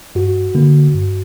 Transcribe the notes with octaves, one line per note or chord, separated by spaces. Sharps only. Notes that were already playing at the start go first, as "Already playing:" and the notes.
G2 F#4
D3 A#3
G2